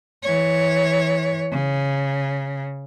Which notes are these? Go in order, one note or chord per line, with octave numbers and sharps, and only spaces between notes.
E3 C#5
C#3